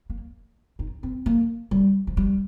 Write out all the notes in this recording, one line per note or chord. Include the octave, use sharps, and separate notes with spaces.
A#3
D#4
C4
A#3
G3
F3
G3